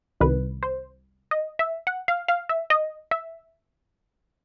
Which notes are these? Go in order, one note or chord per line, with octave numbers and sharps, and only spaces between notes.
C2 C3 D#3 B4
C5
D#5
E5
F#5
F5
F5
E5
D#5
E5